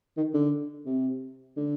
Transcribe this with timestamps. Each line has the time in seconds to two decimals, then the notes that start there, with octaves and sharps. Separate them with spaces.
0.17 D#3
0.34 D3
0.86 C3
1.57 D3